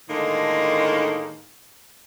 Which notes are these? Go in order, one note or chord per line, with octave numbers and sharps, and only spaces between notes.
A2 D3 D#3 G#3 A#3 D#4